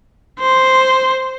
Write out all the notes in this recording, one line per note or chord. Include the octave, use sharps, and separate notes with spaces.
C5